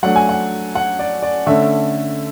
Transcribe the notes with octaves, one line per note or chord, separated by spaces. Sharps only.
F#3 A3 D4 F#5
G#5
F#5
F#5
D5
D5
D3 A3 C#4 E5